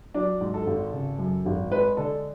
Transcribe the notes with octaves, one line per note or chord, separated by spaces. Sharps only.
F#3 D4
G#2
A4
G#1
C#3
F#2
G#1
G#3 B4
D3 A4